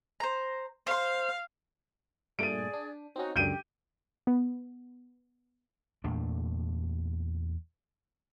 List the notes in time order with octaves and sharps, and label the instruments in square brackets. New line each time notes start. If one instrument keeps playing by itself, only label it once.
[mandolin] C5 A#5
[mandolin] C5 C6 [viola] F5
[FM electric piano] G2 A#2 A3 [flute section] G#4 D5 [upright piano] D7 D#7
[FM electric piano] D4
[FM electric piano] C4 C#4 [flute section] D#4 F#4
[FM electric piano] C#2 F#2 D3 [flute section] G4 [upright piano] G6 D7 D#7
[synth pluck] B3
[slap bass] E2 A#2 A3 D4